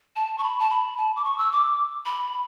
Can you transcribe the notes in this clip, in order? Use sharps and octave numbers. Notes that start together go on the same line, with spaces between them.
A5
C#6
B5
A5
B5
A5
D6
C#6
E6
D6
B5